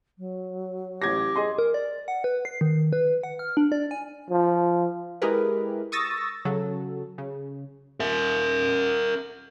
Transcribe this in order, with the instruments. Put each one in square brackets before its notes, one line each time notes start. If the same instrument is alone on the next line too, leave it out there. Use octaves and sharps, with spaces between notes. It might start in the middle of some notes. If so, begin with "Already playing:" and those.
[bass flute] F#3
[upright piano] A1 G#6 A#6 [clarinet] G4
[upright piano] G#4 D#5 C6
[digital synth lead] A#4
D5
F#5
B4
C7
D#3
B4
F#5
F6
D4
D5
G#5
[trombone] F3
[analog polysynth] G#3 E4 G4 G#4 A#4 B4
C#6 D#6 E6 A6 A#6
C#3 F#3 A4
C#3
[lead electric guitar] A#4 E5